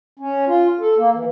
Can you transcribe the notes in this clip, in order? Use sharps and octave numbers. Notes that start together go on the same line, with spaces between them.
C#4
F4
A4
A#3
E3